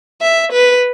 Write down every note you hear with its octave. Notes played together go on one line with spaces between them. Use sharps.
E5
B4